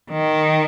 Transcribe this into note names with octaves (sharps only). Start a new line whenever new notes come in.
D#3